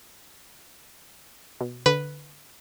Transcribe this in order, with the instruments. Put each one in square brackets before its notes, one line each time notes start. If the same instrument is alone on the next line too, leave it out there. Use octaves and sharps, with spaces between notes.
[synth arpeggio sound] B2
[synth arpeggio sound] D3 [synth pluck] B4